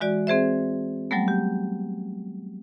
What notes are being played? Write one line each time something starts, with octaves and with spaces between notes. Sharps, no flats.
E3 G#3 F#4 D5
C4 G#4 C5 E5
F#3 G3 A3 B3
G4